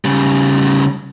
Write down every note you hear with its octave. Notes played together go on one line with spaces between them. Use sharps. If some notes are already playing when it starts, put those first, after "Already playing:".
C#3 G3